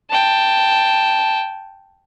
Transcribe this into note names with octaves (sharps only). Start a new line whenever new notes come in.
G5 A5